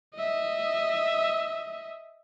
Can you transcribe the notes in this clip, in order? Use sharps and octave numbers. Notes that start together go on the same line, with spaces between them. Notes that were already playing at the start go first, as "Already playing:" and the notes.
D#5 E5